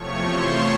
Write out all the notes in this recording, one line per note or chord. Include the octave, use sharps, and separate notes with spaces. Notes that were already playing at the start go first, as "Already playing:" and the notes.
Already playing: E2 C3 F3 A3 C#5 C#6
C5 C6